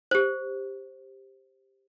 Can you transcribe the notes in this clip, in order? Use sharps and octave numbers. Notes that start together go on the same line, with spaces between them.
G4 C5